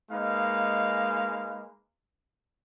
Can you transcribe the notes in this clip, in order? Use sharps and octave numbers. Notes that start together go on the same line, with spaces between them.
G#3 A#3 D#4 B4 F5